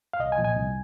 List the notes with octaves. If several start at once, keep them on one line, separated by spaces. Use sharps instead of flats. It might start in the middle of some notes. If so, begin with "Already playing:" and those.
F5
C2 D#5
G#5
A#2 F3
G#5
C2